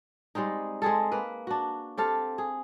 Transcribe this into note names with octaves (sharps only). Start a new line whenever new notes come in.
G3 G#3 C4 D#4
G#3 C4 G#4 A4
A#3 B4
D4 F#4
C4 G4 A4 F5
G#4